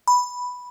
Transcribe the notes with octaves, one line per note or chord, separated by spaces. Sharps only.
B5